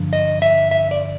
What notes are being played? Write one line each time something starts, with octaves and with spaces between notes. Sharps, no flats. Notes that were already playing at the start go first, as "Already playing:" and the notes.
Already playing: G2 D3 F3
D#5
E5
E5
D5